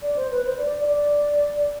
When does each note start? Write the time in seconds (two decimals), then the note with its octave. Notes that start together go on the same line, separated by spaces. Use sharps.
0.02 D5
0.16 C5
0.31 B4
0.45 C5
0.58 D5
0.85 D5